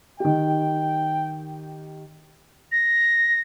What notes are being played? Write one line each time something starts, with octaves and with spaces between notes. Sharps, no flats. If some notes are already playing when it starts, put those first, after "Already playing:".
D#3 G4 G5
A#6